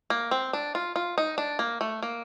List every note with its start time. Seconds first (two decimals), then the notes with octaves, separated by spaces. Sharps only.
0.10 A#3
0.31 C4
0.53 D4
0.75 F4
0.96 F4
1.18 D#4
1.38 D4
1.59 A#3
1.81 A3
2.03 A#3